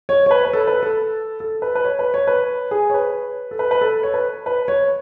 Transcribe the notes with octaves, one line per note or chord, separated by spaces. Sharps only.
C#5
C#5
B4
B4
A4
B4
A4
A4
B4
B4
C#5
B4
C#5
B4
G#4
C#5
B4
A4
B4
B4
A4
C#5
B4
B4
C#5